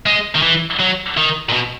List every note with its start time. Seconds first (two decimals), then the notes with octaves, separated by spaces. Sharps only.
0.06 G#3
0.35 D#3
0.42 E3
0.80 F#3
1.17 D#3
1.49 A#2
1.53 B2